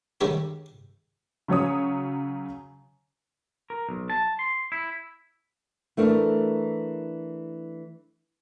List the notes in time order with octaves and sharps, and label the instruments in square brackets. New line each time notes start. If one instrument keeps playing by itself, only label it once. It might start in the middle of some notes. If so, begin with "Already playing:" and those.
[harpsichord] D3 D#3 G3 G4 C#5
[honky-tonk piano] C#3 F#3 C#5 D#6
[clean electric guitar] A#4
B1
A5
C6
E4
[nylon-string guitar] E3 A3 D4 A#4